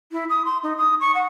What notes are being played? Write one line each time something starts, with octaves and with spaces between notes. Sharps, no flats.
E4
D#6
C6
D#4
D#6
C#6
F#5